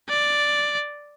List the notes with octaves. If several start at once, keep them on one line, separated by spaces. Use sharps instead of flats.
D5